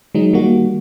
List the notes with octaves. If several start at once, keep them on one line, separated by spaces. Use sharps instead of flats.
D#3 F#3 G#3 D#4
D#3 G3 A#3 F#4